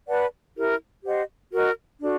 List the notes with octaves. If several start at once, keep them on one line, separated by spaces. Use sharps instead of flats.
B4 D5 F#5 A5
E4 G4 A#4
G4 C5 D#5 F#5
F#4 A#4 D#5
D4 F#4 A4